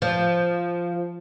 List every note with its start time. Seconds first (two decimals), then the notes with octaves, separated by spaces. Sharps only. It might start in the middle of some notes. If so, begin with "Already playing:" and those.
0.02 F3